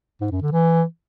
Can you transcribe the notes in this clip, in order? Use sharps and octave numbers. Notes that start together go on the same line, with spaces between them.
G#2
F#2
D3
E3